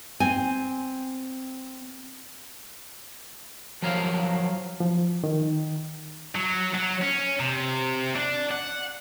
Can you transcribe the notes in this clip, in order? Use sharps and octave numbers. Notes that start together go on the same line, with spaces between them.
C4 G#5
F3 F#3 A#4 C#5 F5
F3
D#3
F#3
F#3
C#4
C3
D4
F#5